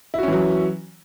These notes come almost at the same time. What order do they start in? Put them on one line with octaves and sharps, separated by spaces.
E4 F#4 C#4 E3 F#3